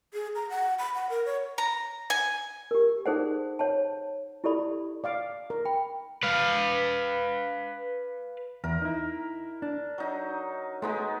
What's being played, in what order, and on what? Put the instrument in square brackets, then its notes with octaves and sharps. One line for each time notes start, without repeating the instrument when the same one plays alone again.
[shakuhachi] G#4
A#5
F#5
B5
F#5
A#4
C#5
[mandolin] A#5
G#5
[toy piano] G4 A#4
D#4 G#4 A4 C5 D5 F#5
C#5 F#5 A5
E4 G4 A4 D5 B5
[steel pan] D5 F5 D6
A#4
[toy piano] G5 B5
[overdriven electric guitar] B4 F5
[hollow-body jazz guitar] E2 [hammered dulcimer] A#4
[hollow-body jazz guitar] D#4 E4
D4
[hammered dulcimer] F#3 D#4
[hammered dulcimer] G#3 B3 D#4 [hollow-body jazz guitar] A3